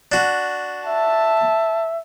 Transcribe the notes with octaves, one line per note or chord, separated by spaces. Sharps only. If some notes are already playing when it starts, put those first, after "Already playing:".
D4 F#4
E5 A5